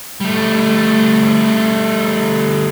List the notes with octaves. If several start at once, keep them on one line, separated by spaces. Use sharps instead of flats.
G3 A3